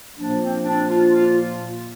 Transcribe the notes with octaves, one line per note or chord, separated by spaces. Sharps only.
A#2 F3 A#3 D4
C4
D4
F4
F4